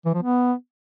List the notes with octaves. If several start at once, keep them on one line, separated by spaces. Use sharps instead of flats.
E3
F3
B3